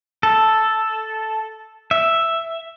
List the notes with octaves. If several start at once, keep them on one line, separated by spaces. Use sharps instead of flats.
A4
E5